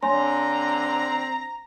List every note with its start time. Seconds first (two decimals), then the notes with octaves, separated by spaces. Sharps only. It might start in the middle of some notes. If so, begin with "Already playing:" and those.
0.03 D3 C4 C#5 G#5 A#5 C6